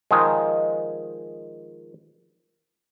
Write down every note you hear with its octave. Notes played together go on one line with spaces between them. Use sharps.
D#3 F3 G#3